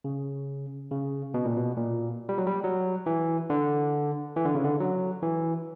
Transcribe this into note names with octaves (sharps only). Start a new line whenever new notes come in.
C#3
C#3
B2
A#2
B2
A#2
G3
F#3
G3
F#3
E3
D3
E3
D3
C#3
D3
F#3
E3